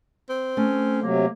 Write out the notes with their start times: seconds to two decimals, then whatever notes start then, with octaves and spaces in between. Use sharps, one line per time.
0.29 C4
0.57 A3 C#4
1.02 C3 F#3 A#3